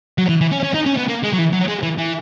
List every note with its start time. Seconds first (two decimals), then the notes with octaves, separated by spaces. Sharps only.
0.18 F#3
0.29 E3
0.41 E3
0.52 C#4
0.63 C#4
0.74 D#4
0.86 C#4
0.97 B3
1.08 A#3
1.23 G#3
1.33 F#3
1.38 E3
1.53 F#3
1.68 G#3
1.83 E3
1.98 E3